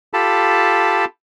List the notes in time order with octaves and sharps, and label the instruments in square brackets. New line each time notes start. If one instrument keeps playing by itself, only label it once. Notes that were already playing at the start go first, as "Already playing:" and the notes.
[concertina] F4 G4 A4 A5 B5